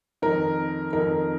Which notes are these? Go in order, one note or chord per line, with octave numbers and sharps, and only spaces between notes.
F2 D#3 A#4
F2 D#3 A#4